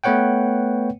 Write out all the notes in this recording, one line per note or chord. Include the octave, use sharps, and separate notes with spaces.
A3 B3 B4 C#5 F#5 G5